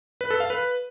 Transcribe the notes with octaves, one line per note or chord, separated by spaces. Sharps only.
B4
A4
F5
B4